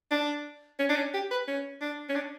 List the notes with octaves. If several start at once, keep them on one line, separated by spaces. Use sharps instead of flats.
D4
C#4
D4
C#4
G4
B4
C#4
D4
C#4
D4